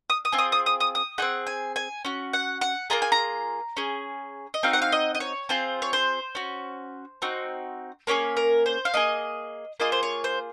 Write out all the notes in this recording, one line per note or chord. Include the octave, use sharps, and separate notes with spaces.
D#6
D#6
C4 F4 G#4
D#6
D#6
D#6
D#6
D#6
C4 D#4 G#4 F#5
G#5
G#5
C#4 F#4
F#5
F#5
A#3 F4 G#4 A#5
G#5
A#5
C#4 G#4
D#5
C4 D#4 F#4 F5
F#5
F5
D#5
D#5
C#5
C4 F4 G#4 C5
C#5
C5
C#4 F#4
C4 D#4 F#4
A#3 C#4 G#4 C#5
A#4
C5
F5
A#3 F4 G#4 D#5
A#3 F4 G#4 D#5
C5
C#5
C5